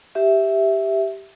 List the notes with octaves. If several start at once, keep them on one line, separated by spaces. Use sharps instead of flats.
G4 E5